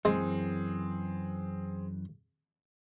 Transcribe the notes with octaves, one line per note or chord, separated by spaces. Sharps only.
F#2 E3 G#3 C4 G#4